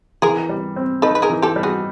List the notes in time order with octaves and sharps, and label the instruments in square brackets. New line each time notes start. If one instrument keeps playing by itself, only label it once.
[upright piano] E3 [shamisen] G#4 A#4
[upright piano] G3
C4
[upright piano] D#4 [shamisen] A4 B4
[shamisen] B4
G#4 A#4
[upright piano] E3
[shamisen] G4 A4
[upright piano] G3
[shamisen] F#4 G#4